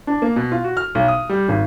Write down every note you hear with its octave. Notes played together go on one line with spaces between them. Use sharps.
D4
A#3
B2
F4
F#4
F6
B1
D#6
G3
G#1